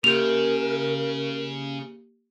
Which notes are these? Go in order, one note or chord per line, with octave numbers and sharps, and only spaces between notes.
C#3 A#3 G4 A#4 G6 F7